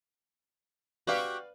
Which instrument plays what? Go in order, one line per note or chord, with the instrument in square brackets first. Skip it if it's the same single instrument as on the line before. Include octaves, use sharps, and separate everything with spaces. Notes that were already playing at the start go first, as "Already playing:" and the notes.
[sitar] F#4 G4 [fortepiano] B4 D5 F5